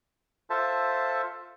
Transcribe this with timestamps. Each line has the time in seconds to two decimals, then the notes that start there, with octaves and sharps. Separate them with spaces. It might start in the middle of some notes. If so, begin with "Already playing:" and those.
0.50 F4 A4 C5 E5 A5